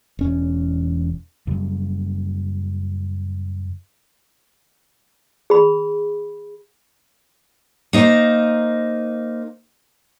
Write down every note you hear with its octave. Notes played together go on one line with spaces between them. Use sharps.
E1 C#4
F#2 C#3 G3
G#4 B5
A#3 D#4 C5